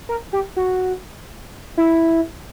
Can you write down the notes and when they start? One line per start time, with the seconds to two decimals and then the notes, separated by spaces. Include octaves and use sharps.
0.09 A#4
0.33 G4
0.56 F#4
1.77 E4